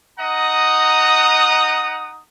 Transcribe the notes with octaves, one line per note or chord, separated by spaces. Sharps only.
D#4 D#5 F#5 A#5 D#6